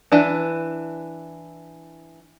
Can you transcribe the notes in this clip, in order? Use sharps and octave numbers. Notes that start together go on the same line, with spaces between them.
E3 D4